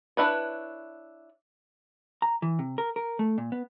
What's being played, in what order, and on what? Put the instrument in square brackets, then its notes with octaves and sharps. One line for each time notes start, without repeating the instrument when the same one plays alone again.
[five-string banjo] D4 E4 B4 C#5
[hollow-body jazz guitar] A#5
E3
C3
A#4
A#4
A3
A#2
B3